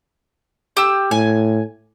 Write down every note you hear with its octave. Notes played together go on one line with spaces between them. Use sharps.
G4 E6
A2 G#5